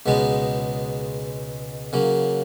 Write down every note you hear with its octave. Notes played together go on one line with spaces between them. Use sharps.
C#2 B2 G#3 B3 D#4
C#3 F#3 A#3